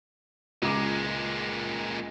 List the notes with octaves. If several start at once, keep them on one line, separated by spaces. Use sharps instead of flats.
C#2 A#2 G#3 A#5 D6